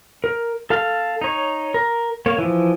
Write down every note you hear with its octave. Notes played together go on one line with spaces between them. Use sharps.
A#4
A4 F5 F6
D#4 C#5
A#4
A#3 C#5
E3 F3